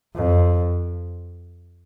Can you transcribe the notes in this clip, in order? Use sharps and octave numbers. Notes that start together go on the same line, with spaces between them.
F2